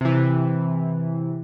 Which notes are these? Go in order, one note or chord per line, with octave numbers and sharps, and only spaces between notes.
C3 E3